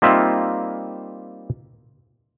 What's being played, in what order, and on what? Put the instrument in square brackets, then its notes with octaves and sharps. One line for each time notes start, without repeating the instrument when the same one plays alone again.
[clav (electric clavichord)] G3 A#3 C4 D#4 F4 E5